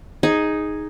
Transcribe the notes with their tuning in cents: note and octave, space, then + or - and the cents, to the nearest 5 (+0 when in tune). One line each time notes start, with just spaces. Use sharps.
D#4 +0 G#4 +0